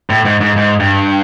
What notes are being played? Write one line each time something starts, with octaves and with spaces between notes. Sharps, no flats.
A2
G#2
G#2
G#2
G2